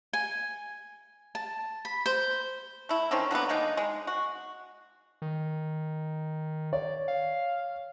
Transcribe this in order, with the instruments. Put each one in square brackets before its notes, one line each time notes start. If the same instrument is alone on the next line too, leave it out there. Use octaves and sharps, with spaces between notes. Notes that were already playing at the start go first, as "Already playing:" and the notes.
[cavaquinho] G#5
A5
B5
C5
[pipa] A3 E4
D3 D#3 C4 C#4
D3 F#3 A#3 B3
D#3 G#3 A#3 D#4
G#3
F#4
[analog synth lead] D#3
[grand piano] C#5 [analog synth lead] D5
[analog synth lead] F5